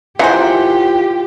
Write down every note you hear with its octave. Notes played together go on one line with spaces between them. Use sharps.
E3 F4 G4 G#4 A#4 C5 F#5